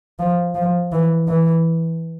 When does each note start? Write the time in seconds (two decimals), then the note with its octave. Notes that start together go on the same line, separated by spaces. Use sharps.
0.19 F3
0.55 F3
0.92 E3
1.28 E3